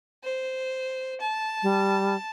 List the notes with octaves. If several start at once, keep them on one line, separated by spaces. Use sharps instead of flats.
C5
A5
G3